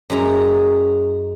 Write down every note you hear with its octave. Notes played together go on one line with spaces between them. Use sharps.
F#2 G#3 E4 A#5